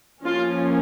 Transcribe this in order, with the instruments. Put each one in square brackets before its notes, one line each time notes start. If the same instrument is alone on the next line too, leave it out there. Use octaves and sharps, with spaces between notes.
[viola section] F3 A#3 C#4 F4